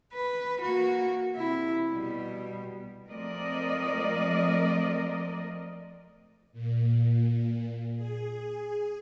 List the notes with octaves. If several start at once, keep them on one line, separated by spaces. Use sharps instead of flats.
B4
A#3 F#4
C3 E4
B2 G3
F3 A3 C4 A#4 D5 D#5
A#2
G#4